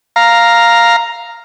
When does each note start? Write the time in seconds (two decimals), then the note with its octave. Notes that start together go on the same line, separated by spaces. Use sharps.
0.16 F5 A#5